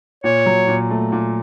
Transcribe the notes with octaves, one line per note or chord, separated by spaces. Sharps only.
A#2 C#5
F#3
A#2
A3
A#2